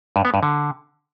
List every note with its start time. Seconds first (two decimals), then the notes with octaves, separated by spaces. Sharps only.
0.16 G2
0.25 B3
0.34 G2
0.43 D3